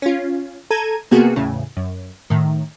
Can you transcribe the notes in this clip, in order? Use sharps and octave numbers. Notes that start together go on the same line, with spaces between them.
C#4 F4
A4 A#5 G#6 D#7
C3 A#3 B3 F#4 G#4
E2 A2 C#3
F#2
A2 D#3